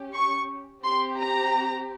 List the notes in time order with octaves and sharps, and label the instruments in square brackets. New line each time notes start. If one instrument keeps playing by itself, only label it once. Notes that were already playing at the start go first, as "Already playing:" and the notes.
Already playing: [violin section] C#4 G4
C#6
C4 G4 C6
A#5